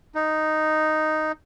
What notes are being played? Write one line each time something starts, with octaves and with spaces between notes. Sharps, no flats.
D#4